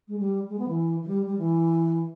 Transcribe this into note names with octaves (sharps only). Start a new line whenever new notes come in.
G#3
G3
G#3
B3
E3
E3
G3
G3
E3